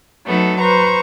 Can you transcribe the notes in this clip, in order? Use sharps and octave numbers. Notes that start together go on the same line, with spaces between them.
F#3 A3 B3 D#4 A4
B4 C5 A#5 C#6